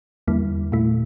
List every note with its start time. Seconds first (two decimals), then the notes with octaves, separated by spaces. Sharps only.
0.28 E2 D3 G3 A#3 E4
0.72 A#2 A3 E4